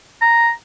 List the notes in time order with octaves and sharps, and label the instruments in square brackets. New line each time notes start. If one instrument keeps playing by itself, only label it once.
[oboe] A#5